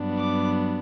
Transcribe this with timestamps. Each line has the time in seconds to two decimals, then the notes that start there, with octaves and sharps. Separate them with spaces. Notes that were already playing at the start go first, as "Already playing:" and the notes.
Already playing: G2 F#3 B3 D4
0.17 D6